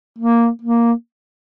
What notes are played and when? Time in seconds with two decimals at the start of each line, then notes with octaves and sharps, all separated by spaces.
0.18 A#3
0.62 A#3